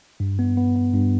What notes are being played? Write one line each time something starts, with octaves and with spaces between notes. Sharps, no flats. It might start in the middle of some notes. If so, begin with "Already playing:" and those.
G2
B3
B3
B3
G2